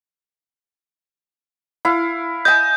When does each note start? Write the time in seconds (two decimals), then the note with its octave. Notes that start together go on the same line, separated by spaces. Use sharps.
1.85 E4 F5
2.45 D#5 G#5 G6